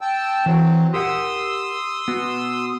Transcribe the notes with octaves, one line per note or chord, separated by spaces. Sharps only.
G5 A5 E6
E3 F#3 C4
G4 A#4 F#5 C6 D#6 E6
B3 F#4